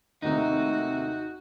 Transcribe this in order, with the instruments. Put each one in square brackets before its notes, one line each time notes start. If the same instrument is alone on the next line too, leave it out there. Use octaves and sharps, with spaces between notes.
[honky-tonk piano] D#2 A2 C3 [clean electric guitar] D#4 [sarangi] F#4